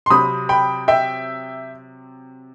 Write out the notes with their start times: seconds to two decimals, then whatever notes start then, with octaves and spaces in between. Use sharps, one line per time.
0.06 C6
0.10 C3 F#3 C4 B5 D#6
0.49 G5 B5
0.88 E5 G5